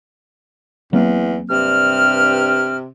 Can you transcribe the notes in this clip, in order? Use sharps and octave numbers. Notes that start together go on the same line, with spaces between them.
E2 F#3 A#3 C4
G2 C3 F6